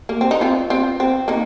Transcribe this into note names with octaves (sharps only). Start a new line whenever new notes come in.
A#3
C4
D#4
C4 F4
C4 F4
C4
A#3 D#4